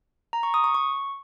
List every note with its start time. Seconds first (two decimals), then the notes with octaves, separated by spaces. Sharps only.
0.33 A#5
0.43 C#6
0.54 D#6
0.64 C#6
0.75 C#6